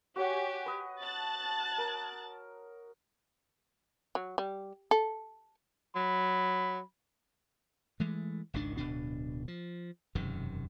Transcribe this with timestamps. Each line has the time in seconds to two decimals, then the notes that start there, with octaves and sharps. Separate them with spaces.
0.16 F#4 G4 C#5 F#5 G#5
0.66 B4 D#5
1.02 A5 F#6 A6
1.78 A#4
4.15 F#3
4.38 G3
4.91 A4
5.95 F#3 B5
8.00 E3 G#3 A3
8.54 G#1 C#2 D#3 D4
8.77 D1 B2 D4
9.48 F3
10.15 E1 F#2 C3 D#3